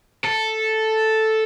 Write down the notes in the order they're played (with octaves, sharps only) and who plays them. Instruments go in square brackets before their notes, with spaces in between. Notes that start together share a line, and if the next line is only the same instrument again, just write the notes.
[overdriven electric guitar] A4